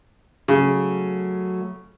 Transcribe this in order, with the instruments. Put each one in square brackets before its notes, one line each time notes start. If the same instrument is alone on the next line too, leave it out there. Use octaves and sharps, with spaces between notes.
[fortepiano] C#3 [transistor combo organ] F#3 A3